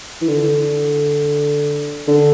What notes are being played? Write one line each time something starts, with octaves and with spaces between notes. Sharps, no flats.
E3
D3
D3